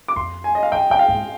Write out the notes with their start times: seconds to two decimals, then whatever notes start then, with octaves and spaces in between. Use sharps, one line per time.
0.08 D6
0.16 F2 C6
0.44 G#5
0.55 D#5
0.63 F5
0.72 G2 G5
0.90 F2 G5
0.99 F5
1.08 G#2